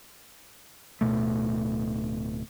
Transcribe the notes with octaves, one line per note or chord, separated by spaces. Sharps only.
D1 B2 A3